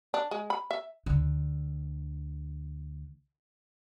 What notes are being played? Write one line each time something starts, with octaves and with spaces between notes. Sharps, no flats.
D4
G#3
B5
E5
D2 D3